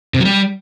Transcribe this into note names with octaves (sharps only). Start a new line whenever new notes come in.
C3
F#3
G3